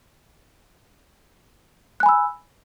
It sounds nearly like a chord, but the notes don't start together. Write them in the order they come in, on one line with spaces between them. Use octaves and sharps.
F#6 G#5 B5 E6